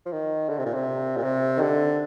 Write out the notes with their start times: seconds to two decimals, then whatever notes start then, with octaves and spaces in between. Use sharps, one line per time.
0.06 F3
0.12 D#3
0.49 D3
0.58 C3
0.66 A#2
0.74 C3
1.17 A#2
1.24 C3
1.57 D#3
1.60 D3